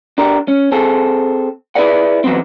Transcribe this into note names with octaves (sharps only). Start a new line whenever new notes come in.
D4 G4 A#4
C#4
C4 G#4 A4
E4 G#4 B4 D5 F#5
E3 F#3 B3 C4